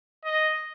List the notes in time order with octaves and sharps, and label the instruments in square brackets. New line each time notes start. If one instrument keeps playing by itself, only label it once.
[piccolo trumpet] D#5